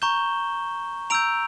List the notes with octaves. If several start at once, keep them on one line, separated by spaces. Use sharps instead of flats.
A#5 C#6 G6 E7 G7
A#5 E6 G6 D7 F7